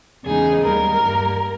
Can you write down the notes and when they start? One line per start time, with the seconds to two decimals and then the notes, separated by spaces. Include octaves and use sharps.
0.23 E2 C#3 G#3 B3 D#4 G#4
0.61 D#2 D#3 G3 A#4
1.00 G2 G3 A#3